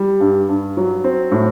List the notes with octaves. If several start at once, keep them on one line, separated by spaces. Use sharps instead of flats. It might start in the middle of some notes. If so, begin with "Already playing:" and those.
Already playing: G3
G2
G2
F#3
C4
A2